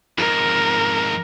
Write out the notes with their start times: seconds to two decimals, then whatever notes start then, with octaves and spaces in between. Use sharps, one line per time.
0.18 F2 G#2 A#4